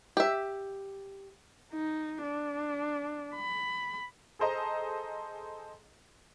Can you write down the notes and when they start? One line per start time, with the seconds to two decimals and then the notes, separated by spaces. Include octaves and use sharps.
0.17 G4 E5
1.73 D#4
2.23 D4
3.35 B5
4.39 G#4 A4 C5 D#5 A#5